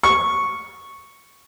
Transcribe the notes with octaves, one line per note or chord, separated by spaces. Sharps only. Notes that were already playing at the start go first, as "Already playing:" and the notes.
C#6